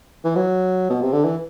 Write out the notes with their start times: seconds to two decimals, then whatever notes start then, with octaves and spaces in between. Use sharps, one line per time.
0.24 E3
0.36 F#3
0.90 B2
1.02 C3
1.13 D3
1.25 E3